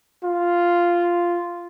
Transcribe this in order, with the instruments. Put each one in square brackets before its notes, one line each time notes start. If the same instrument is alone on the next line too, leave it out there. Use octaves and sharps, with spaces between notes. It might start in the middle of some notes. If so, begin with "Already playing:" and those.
[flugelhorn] F4